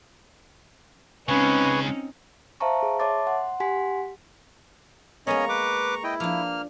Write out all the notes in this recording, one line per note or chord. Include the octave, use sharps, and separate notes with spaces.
C#3 G#3 C4 C#4 D#4 B4 G#5 C#6
C5 E5 F5 A5 A#5 C#6
G#4
C#5 E5 A5 C6 D6 A6
F#5 C6
G4 F#5 G#5 C6 B6
G#3 A#3 B3 C#4 C#5 D#5 A#5 C#6
B4 D6
E4 D#5 G5
F3 A#3 D4 F6